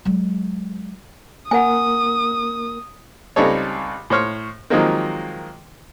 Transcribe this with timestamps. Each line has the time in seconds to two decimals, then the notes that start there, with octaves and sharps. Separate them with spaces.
0.05 F#3 G#3
1.51 A#3 A#4 F#5 G#5 D#6
3.36 C#2 G3 C4 D#4 A4 C#5
4.10 A2 C5 C#5 F6
4.70 D#3 F3 F#3 G#3 A#3 C4